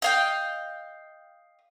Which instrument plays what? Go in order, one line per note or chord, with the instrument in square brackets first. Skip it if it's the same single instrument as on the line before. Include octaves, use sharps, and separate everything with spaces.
[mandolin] D#5 F5 G5